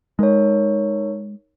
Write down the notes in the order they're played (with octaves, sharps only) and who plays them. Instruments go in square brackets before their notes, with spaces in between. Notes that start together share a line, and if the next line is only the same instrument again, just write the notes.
[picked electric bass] G#3 [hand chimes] D#4 A#4 C#5